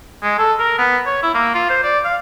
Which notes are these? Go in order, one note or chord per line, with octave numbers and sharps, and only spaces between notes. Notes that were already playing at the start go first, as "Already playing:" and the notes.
G#3
A4
A#4
B3
C#5
E4
A#3
F4
C5
D5
F5